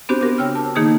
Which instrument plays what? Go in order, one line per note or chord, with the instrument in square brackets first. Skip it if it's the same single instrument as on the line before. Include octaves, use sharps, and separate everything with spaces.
[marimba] B3 C4 D4 F#4 G4 C5
D4 F#4 A#4
C#3 C#5 G5 E6 F6
A5
D#3 A#3 D#4 G#4 D#6 G#6